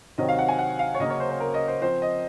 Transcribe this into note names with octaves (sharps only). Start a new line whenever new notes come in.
C3 D#3 F#3 C4 D#5
F5
F#5
G#5
F#5
F5
C#5
C#3 F#3 A#3 C#4 D#5
C#5
C5
C5
A#4
D#5
C5
F3 C4 C5
D#5